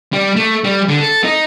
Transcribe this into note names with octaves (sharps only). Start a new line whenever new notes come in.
G3
A3
G3
D3
A4
D#4